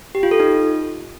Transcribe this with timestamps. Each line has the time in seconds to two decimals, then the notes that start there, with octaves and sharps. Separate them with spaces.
0.15 G4
0.23 F4
0.31 A4
0.40 D#4